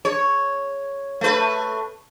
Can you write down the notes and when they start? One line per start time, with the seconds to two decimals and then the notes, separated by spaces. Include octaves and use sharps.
0.05 C#5
1.21 A3 B4